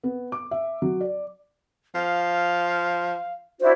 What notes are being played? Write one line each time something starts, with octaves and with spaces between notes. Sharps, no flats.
B3
D6
E5
F#3
D5
F3 F5
D4 E4 F#4 C5